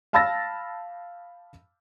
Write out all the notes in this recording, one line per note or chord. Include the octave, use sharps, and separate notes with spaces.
F5 A5 B5 E6 A6 A#6